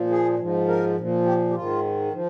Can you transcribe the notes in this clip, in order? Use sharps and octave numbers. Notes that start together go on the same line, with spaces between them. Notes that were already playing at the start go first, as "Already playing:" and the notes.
Already playing: A#2 F3
G#4
G#2 F3
A#4
A#2 F3
G4
G4
G#2 D#3 F4
F3